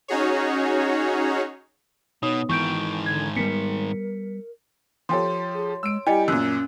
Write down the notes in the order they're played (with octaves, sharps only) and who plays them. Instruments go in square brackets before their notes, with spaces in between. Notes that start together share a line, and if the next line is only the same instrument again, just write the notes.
[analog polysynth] C#4 D#4 F#4 G#4 C#5
[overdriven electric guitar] B2 [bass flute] B3 [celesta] D#4 C#5 D#6
[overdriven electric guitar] G#2 D#3 [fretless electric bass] E3 [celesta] C#6 G6 D7
[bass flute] D3 [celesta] G#6
[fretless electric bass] G3 A#3 B3 [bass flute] A#4 [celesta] B6 C#7
[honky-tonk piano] F3 G4 A4 [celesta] C#5 C6
[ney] G#4
[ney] G#3 [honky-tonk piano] E6 D7
[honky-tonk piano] G3 G4 [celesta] E4 D#5 C#7 [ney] G#5
[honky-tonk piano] F#2 A#2 [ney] C#4 [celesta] E6 F#6